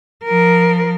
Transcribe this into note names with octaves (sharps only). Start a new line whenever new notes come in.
F3 A#4